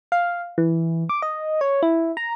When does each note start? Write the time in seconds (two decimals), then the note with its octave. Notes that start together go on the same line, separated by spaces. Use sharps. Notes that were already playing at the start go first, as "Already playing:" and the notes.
0.12 F5
0.58 E3
1.09 D6
1.22 D#5
1.61 C#5
1.83 E4
2.17 A#5